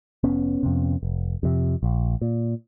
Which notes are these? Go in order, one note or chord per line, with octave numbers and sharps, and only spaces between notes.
F1 B3 C#4
F2 C3
F1
F2 C3
A#1
A#2